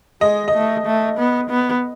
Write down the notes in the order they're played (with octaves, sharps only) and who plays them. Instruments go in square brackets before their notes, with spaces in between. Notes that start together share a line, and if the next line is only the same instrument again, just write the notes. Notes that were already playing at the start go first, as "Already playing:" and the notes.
[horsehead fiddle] G#3 [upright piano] D#5
[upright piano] D#5
[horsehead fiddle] A3
A3
B3
B3